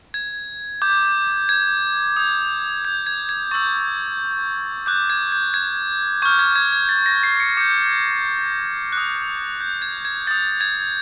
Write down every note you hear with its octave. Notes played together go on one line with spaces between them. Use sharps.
G#6
D6 G6
G#6
D#6 G6
G6
G#6
G#6
C#6 E6 G6 A6
D6 F#6 G6
G#6
G6
G#6
C#6 F6 G6
G#6
G#6
G#6
A6
A#6
C7
C#7
D6 G6 C#7
D#6 F#6
G6
G#6
G#6
D#6 G6 A6
G#6